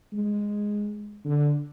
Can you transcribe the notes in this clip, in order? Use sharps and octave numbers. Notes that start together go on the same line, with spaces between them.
G#3
D3